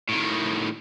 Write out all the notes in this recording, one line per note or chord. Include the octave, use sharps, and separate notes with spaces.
A2 D#3